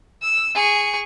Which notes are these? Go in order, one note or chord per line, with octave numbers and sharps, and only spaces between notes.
E6
G#4 C#6